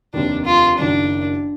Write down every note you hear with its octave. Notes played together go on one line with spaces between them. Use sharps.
F1 D#2 D#3 D4
F4
F#1 F#2 D#3 D4